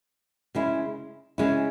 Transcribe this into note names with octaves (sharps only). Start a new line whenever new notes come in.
C#3 G#3 C#4 E4
C#3 G#3 C#4 E4